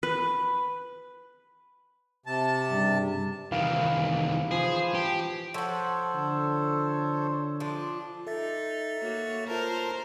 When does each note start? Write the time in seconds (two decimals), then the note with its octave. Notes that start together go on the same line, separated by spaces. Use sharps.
0.03 B4
2.26 C3 A5
2.71 G2 C#3 G3
3.52 C2 D#3 E3 F5
4.51 F3 G#4
4.95 G4
5.54 F3 A4 C5 C#5 F#5
6.15 D3
7.60 F3 D4 F4
8.27 D#4 A4 E5 A6
8.99 A#3 F#4 C#5
9.48 F4 A#4 C5 A5 A#5